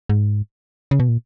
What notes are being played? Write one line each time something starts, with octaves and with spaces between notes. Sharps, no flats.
G#2
C#3
B2
A#2